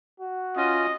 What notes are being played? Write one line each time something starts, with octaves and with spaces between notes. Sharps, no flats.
F#4
C#4 F4 D#5